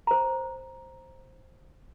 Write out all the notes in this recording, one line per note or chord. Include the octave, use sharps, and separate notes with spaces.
C5 A#5